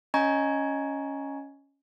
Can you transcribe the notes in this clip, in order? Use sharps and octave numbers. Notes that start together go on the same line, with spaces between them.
C#4 D#5 G#5 A#5 C#6 G#6